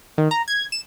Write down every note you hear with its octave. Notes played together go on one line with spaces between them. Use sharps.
D#3
A#5
G#6
E7